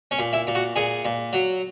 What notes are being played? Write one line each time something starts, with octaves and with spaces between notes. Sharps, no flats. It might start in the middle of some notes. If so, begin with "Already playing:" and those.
C#4
A#2
E4
A#2
F#4
A#2 G#4
A#2
F#3